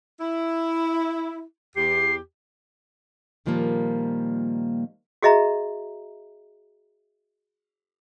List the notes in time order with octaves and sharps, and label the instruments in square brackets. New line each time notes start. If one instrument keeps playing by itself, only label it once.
[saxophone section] E4
[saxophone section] E2 G4 [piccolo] C7
[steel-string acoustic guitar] A#2 D#3 F3 G3 A#3
[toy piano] F#4 G#4 D#5 E5 A#5